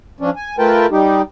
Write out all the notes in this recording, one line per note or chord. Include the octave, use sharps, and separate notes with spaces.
F3 C#4 D4
G#5
A3 F4 A#4 B4 G5 A5
G3 D#4 G4